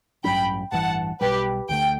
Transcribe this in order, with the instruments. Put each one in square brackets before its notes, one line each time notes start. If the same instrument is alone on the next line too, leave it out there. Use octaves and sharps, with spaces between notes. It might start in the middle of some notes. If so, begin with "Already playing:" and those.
[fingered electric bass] A1 G2 F#3 C#4 [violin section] G5 B5
[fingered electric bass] A1 G2 E3 [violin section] F#5 A5
[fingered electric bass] B1 B2 G3 [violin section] G4 B4
[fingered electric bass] D2 D3 A3 [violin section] G5